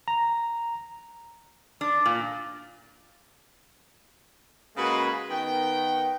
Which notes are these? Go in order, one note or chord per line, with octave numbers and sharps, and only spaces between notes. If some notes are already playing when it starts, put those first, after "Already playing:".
A#5
D4 D6
A#2
C#3 G#3 A#3 F#4 G#4 B4
D#3 B3 G5